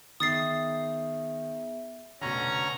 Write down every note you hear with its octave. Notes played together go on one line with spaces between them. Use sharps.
D#3 B3 G#4 E5 D#6 A6 C7
F1 B2 D3 C#4 A#5